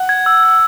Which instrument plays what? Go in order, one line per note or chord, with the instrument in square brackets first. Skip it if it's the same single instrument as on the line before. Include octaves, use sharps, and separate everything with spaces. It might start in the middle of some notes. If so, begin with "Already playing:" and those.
Already playing: [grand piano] F#5
[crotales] G#6
E6
G#6